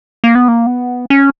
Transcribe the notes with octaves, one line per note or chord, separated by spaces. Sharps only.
A#3
B3
A#3
B3
C#4